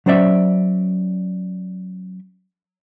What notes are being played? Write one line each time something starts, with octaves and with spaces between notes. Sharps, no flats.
F#3 C#4 C5 D5 E5